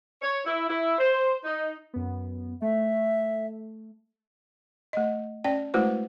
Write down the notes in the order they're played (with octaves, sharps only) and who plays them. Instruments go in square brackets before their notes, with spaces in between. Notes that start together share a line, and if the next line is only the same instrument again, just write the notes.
[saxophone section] C#5
E4
E4
C5
D#4
[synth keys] F#2 B3
[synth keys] A3 [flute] E5
[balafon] A3 D#5
C#4 D5 G5
G#3 A3 E4 F#4 B4 C5